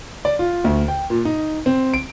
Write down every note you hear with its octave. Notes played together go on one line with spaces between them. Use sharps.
D5
F4
D2
G5
A#2
D#4
C4
D7